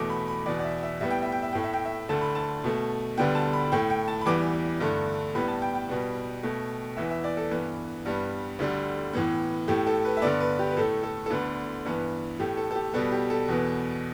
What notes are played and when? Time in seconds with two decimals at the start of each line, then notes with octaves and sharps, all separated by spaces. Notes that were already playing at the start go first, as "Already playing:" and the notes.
Already playing: E2 B2 A3 D6
0.10 B5
0.28 B5
0.46 E2 B2 B3 D5
0.59 D5
0.64 E5
0.83 E5
1.01 A2 G3 B3 E5
1.11 G5
1.22 E5
1.32 G5
1.42 E5
1.53 A2 A3 G5
1.64 E5
1.74 G5
1.85 E5
2.09 D2 D3 A3 A5
2.21 B5
2.35 A5
2.64 B2 A3
3.17 D2 D3 G3 B3 G5
3.35 A5
3.53 B5
3.72 A2 A3 G5
3.90 G5
4.08 A5
4.21 B5
4.26 E2 E3 G3 B3 D6
4.80 G2 D3 A3
5.35 A2 G3 B3 B5
5.48 A5
5.62 G5
5.75 G5
5.89 B2 G3 B3
6.43 B2 A3
6.97 E2 E3 B3 E5
7.11 E5
7.24 D5
7.37 A4
7.51 G2 E3 B3
8.06 G2 G3 B3
8.59 D2 D3 G3
9.13 A2 E3 B3
9.68 A2 A3 G4
9.87 A4
10.05 B4
10.17 E5
10.22 G2 D3 B3 D5
10.40 B4
10.59 G4
10.71 B4
10.77 A2 A3 A4
11.03 A4
11.26 A4
11.30 D2 D3 B3 B4
11.85 G2 E3 B3
12.40 A2 A3 G4
12.57 A4
12.71 A4
12.75 G4
12.93 B2 G3 B3 A4
13.12 G4
13.30 A4
13.48 E2 B2 B3